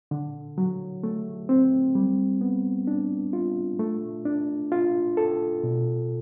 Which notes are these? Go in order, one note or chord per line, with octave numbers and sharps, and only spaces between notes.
D3
F#3
A3
C4
G3
B3
D4
F4
A3
D4
F4
A4
B2